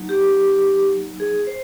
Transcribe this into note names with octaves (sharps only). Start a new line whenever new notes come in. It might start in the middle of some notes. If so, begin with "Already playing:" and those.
Already playing: F#3 A#3 D#4
G4
G#4
C5